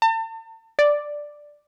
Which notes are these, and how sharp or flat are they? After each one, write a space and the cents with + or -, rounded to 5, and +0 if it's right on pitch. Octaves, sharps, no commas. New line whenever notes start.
A5 +40
D5 +5